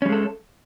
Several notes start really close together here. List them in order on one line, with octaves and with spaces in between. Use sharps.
C#4 G3 G#3 A4